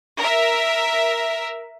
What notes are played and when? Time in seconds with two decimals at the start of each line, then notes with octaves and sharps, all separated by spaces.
0.18 A#4 E5